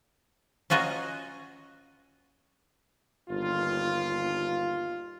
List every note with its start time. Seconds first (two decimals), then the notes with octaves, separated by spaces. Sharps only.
0.70 C#4 F4 F#4 D#5 A#5
3.30 G1 D#2 F4